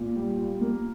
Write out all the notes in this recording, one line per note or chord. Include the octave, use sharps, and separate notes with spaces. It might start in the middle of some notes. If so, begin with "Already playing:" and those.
Already playing: A#2
G3
F4
A#3